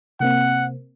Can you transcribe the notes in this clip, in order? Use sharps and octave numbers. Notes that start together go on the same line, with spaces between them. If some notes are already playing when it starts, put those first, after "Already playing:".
C3 A#3 C4 F#5